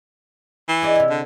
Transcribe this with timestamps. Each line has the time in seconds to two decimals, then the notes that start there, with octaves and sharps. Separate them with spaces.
0.69 E3
0.82 G#4 D5 D#5
0.95 C3 E4
1.10 D3